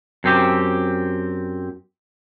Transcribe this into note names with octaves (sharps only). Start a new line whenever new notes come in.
F#2 C4 G4